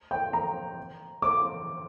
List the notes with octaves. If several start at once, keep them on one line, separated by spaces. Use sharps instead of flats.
G5
A#5
D6